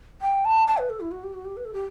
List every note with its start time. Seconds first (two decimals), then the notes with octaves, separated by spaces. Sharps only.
0.22 G5
0.45 A5
0.68 A5
0.78 B4
0.90 A4
1.00 E4
1.11 F#4
1.24 G4
1.34 F#4
1.45 G4
1.57 B4
1.65 A4
1.73 G4